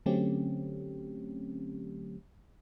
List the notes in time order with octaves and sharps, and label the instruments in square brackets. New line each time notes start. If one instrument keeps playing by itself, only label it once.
[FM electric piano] D3 F#3 A3 C4 C#4 G4